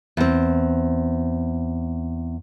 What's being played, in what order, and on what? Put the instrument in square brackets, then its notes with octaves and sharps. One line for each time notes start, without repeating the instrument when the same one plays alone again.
[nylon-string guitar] E2 C4